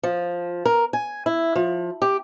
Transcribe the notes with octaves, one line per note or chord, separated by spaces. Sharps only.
F3
A#4
G#5
E4
F3
G4